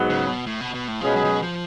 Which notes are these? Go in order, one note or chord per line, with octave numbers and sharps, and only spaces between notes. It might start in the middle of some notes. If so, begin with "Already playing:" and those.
Already playing: G#2 F#3 B3
C#3
B2
A2
B2
B2
A2
B2 F3 G#3 C#4 G#4 B4
F#3
F3
F#3
F3